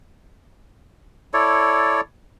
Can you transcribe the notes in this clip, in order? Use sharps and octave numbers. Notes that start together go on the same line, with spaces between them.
E4 A4 C#5 D5